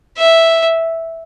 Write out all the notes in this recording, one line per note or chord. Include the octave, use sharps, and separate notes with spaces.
E5